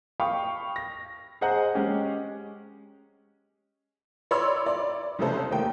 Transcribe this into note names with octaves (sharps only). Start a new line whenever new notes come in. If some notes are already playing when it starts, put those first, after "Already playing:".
F5 G5 B5 C#6 D#6
A#6
G#4 C5 D#5 F#5 A#5
G#3 C#4 G4
C#5 D5 B5 C6 E6
D5
C2 C#3 A3 C#4 A4 C5
D#2 A3 A#3 G5